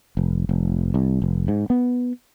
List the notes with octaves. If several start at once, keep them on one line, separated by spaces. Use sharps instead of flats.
F1
F1
C2
F1
G#2
B3